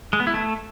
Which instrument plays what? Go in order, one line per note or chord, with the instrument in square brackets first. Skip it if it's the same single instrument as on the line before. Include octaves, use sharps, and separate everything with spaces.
[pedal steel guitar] G#3
B3
E4
A3